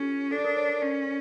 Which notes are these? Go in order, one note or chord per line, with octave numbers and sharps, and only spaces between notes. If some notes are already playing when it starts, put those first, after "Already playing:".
Already playing: C#4 F4 G4 A4
D4 A4
A#4
C#5
A#4
C#4 D5